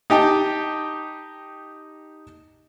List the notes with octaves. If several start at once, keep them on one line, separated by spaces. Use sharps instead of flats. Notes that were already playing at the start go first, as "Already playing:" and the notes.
D#4 G4 G5 A5